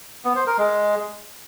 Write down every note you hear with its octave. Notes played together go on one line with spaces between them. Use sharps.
B3
C5
A#4
G#3